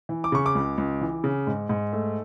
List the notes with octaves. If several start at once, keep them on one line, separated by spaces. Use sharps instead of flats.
E3
D6
C#3 C#6
D6
C#2
C#2
E3
C#3
G#2
G#2
A3